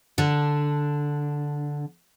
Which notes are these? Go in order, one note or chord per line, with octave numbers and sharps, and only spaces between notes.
D3 D4